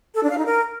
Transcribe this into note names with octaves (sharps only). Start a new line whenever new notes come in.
A4
D4
F5
D#4
A#4